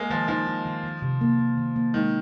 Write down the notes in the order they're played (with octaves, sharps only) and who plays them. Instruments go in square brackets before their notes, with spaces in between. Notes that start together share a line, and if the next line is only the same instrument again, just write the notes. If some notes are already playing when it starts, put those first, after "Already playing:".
Already playing: [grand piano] G#3 A#3
[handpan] D#3 [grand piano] F3
[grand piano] F3 [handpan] D#4
[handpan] D#4
D#3
D#3
C3
A#3
A#3
D#3
A#3
[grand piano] D#3 [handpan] G#3